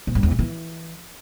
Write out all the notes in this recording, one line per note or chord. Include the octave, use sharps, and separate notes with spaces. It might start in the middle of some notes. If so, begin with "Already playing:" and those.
A#2
G2
E2
A#2
E3